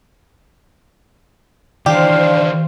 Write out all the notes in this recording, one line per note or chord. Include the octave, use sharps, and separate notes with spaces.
D#3 E3 D4 G4 C5 F5